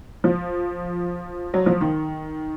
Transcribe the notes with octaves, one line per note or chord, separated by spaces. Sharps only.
F3
F#3
F3
D#3